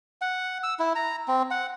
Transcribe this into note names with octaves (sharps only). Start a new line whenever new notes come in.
F#5
E6
E4
A#5
C4
F#5